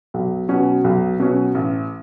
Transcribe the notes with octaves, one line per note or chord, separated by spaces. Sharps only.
B1
B2 F#3 C#4
B1
B2 F#3 C#4
A1